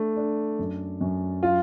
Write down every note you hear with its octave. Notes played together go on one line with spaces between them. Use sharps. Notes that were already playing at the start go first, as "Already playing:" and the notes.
Already playing: A3 D4
D4
F#2
F#2
F4